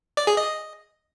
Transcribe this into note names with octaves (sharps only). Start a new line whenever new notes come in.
D5
G#4
D#5